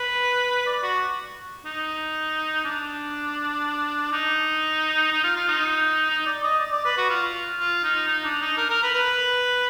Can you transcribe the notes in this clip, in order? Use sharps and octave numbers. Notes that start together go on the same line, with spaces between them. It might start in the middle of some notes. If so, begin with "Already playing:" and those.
Already playing: B4
D5
F#4
D#4
D4
D#4
D#4
F4
F4
D#4
D#4
D5
D#5
D5
D5
B4
F#4
F4
F4
D#4
D#4
D4
D#4
A#4
A#4
B4
B4